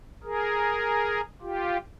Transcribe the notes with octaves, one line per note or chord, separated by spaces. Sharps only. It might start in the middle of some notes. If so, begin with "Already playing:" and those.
G#4 A#4
F4 G4